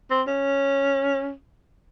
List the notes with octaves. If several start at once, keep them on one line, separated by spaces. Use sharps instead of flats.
C4
C#4